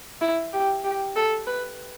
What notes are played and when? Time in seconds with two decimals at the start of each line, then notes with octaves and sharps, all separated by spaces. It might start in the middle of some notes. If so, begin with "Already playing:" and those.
0.21 E4
0.53 G4
0.84 G4
1.16 A4
1.47 B4